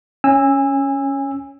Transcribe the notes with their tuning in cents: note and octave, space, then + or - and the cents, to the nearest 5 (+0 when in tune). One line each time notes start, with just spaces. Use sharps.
C#4 +0 G#5 -25 E6 +0